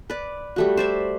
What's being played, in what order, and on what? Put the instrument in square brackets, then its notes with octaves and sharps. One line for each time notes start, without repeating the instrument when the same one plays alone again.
[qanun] B4 D5
G3 A3 F#4
C5 D5 E5